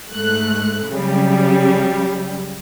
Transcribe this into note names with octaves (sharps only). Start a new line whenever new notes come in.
G#2 A3 F#6
C#3 F#3 G3